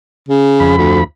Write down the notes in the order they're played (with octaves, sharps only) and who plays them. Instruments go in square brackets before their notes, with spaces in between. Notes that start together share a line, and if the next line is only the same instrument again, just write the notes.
[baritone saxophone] C#3
[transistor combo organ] F2 B5
[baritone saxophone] D2